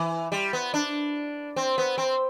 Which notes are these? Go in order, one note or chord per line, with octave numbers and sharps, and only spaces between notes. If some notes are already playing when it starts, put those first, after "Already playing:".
Already playing: E3
G3
B3
D4
C4
B3
C4